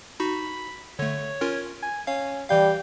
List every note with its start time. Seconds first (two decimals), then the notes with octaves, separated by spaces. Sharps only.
0.20 D#4 F#4 B5
0.99 D3 A3 C#5
1.41 C#4 F4 A#4
1.82 G#5
2.07 C#4 F5
2.50 E3 G3 F5 G5